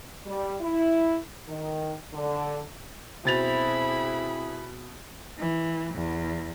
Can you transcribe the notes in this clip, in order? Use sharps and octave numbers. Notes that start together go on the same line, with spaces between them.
G3
E4
D#3
D3
B2 C4 E4 G#4 B5 A6 F7
E3
E2